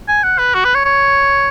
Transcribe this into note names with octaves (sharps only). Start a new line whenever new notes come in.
G#5
F#5
B4
F#4
B4
C#5
C#5